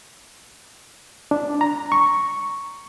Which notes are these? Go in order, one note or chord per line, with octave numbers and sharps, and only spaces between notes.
D4
A#5
C#6